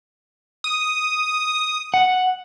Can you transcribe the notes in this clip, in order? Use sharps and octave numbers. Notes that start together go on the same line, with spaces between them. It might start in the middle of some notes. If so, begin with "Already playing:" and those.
D#6
F#5